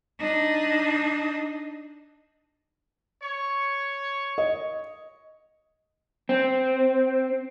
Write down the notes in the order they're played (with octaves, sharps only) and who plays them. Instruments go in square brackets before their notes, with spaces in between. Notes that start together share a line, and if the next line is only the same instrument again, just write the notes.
[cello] D4 D#4
[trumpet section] C#5 C#6
[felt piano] D#5
[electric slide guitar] C4